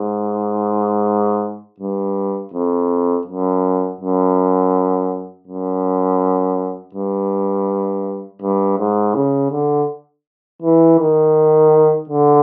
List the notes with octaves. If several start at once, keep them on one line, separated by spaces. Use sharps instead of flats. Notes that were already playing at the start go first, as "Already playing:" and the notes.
Already playing: G#2
G2
F2
F#2
F#2
F#2
G2
G2
G#2
C#3
D3
E3
D#3
D3